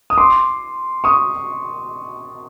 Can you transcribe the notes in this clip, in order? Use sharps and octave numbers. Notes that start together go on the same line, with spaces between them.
D#6
C6 D6
C#6 D#6